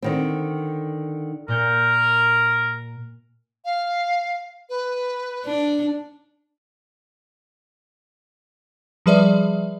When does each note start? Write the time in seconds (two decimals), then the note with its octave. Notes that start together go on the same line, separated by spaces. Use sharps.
0.02 D3 D#3 C4
1.48 A#2 A#4 G6 C#7
3.65 F5
4.70 B4
5.45 D4
9.06 F3 G3 G#4 B4 D5 E5